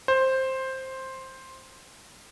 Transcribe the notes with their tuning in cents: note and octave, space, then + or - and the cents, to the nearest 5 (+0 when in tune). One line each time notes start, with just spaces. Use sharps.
C5 +10